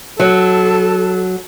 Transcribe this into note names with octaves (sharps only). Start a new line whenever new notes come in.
F#3 A4